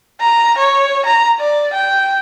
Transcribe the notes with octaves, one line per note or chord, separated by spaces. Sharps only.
A#5
C#5
A#5
D5
G5